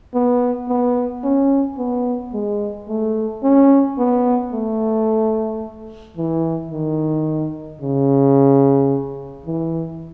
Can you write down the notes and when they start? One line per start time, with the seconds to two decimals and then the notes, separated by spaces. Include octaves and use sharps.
0.14 B3
0.69 B3
1.24 C#4
1.78 B3
2.34 G#3
2.88 A3
3.44 C#4
3.98 B3
4.53 A3
6.17 E3
6.72 D#3
7.82 C#3
9.46 E3